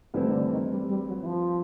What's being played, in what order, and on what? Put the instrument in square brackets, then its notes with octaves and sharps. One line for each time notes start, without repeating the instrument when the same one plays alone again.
[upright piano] G2 E3 A3 C4 E4 [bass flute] D3
[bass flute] D#3
D3
D#3
G3
G3
F#3
E3
F3